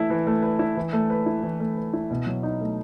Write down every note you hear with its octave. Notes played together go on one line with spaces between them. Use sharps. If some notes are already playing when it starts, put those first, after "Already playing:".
Already playing: E3 A3 E4
E3
A3
B4
E4
E3
A3
B4
E4
E3
A3
B4
E4
B2
F#3
D#4
A3